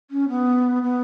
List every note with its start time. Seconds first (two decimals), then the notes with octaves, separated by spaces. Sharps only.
0.11 C#4
0.29 B3
0.83 B3